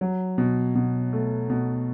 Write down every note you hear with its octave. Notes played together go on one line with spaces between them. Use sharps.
F#3
B2
B2
A3
B2